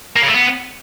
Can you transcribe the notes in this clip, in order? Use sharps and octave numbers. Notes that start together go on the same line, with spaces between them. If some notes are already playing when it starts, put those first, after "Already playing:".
A#3
C#3
A3
B3